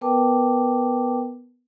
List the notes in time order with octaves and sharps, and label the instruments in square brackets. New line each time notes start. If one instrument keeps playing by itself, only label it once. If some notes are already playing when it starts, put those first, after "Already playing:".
[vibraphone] B3 A#4 B4 G5 A5 D6